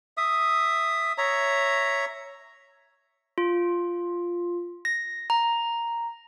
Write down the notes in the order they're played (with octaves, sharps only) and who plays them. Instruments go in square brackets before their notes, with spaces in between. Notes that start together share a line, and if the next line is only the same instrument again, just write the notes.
[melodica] E5 D#6
C#5 E5 A#5
[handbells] F4
A#6
A#5